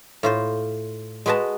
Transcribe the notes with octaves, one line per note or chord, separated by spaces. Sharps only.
A2 F4 C5
G#3 F#4 B4 D#5 A5